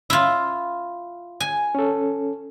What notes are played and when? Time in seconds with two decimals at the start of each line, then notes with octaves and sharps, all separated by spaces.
0.10 E4 F4
1.40 G#5
1.75 C#4 A4